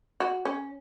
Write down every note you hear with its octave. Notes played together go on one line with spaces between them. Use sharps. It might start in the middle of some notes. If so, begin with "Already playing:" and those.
F#4
C#4